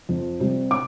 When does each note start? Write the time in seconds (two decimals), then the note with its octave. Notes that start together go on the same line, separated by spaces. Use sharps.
0.09 F2
0.40 C3 G3
0.71 D6